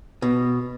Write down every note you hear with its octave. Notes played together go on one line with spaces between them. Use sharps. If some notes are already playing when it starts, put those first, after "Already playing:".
B2